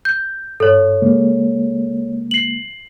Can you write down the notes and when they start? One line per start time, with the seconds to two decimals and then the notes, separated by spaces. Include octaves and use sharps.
0.05 G6
0.60 G2 A4 C#5
1.02 C#3 G#3 A#3
2.31 C7 F#7